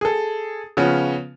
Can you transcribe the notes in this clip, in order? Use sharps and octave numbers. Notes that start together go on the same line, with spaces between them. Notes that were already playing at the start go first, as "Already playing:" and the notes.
G#4 A4
C#3 F3 B3 C#4